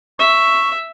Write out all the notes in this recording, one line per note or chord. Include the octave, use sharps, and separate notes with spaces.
E5 C#6